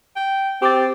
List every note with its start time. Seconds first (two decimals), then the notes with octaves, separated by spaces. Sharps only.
0.16 G5
0.62 C4 G4 G5 D6 A6